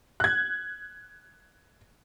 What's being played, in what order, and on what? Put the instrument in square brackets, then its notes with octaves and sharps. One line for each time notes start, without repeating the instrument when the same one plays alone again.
[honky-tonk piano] F#6 G#6